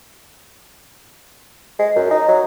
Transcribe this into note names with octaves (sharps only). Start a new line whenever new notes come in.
G#3
F#2
D#4
F#3